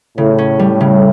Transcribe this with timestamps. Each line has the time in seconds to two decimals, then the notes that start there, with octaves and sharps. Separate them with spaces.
0.17 A2 C#3
0.38 C#4
0.59 G3
0.81 C#3